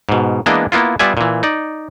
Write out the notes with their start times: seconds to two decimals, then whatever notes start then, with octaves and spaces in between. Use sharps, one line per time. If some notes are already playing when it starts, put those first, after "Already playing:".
0.09 G#2 B2
0.46 E3 G#3 A#3 B3 D4 D#5
0.72 A#3 B3 E4 F4
0.99 G3 B3 F4 D5 E5 G#5
1.17 A#2 E3
1.43 D#4 D5